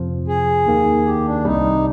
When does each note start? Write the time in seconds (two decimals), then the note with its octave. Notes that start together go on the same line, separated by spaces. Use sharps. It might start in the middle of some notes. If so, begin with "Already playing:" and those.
Already playing: F2 C3 F3
0.28 G#4
0.66 D#2 D#3 A#3
1.06 G4
1.25 D4
1.45 C2 C3 G3 D#4